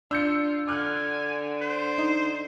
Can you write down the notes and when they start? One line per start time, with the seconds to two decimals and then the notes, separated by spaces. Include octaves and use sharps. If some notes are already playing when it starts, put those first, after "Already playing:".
0.11 D4 F4 E6 G6 C#7
0.67 D3 G#5 D6 F6 F#6
1.61 C5
1.98 D#4